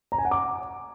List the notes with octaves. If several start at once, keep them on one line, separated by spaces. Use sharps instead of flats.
A#5
G#5
F#5
D6